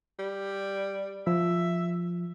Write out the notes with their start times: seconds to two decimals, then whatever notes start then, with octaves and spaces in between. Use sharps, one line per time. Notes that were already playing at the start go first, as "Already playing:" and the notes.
0.19 G3
1.27 F3 E5